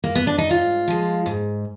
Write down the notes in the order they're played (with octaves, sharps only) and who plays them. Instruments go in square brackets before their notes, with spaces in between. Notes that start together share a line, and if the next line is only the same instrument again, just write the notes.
[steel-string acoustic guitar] A#3
B3
D4
D#4
G#2 F4
F3 G#3
G#2